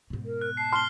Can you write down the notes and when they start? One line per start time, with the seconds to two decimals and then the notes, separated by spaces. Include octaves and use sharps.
0.10 G#2 B2
0.25 A#4
0.41 F#6
0.57 A5 C7
0.73 C6 F6 C7 G7